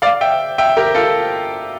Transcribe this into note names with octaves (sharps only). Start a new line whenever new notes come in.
D5 F5
E5 G5
E5 G5
G4 A#4
F4 A4